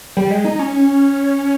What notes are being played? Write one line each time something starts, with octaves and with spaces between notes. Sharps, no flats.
G3
G#3
D#4
C#4